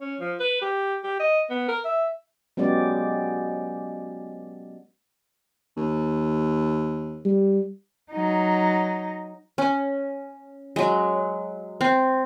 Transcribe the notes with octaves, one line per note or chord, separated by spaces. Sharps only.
C#4
F3
B4
G4
G4
D#5
B3
A#4
E5
F#3 G#3 B3 C#4 G4 D5
D#2
G3
F#3 D#4
C#4
F#3 G#3
C4